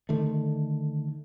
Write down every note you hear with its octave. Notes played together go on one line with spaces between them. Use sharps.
D3 D#3 A3